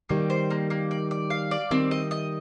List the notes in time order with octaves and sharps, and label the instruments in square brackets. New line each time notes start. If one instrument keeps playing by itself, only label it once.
[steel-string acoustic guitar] D#3 G3 [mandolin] A#3
[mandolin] C5
A#3
A#3
D5
D5
F5
D5
[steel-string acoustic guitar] D#3 G3 [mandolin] C4
[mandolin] D#5
D#5